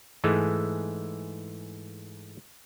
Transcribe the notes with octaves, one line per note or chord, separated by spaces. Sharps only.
G#2 E3 G#3 A3